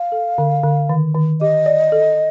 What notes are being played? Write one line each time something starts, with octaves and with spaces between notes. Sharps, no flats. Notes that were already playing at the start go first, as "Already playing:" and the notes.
Already playing: F5
A4
D3
D3
D#3
D#3
G4 D#5
D5
A4